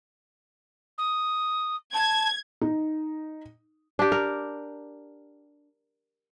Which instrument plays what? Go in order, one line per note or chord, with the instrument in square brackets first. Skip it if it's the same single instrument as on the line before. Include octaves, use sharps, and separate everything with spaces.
[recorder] D#6
[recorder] A5 [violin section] G#6
[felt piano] D#4
[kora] D4 G4
A#4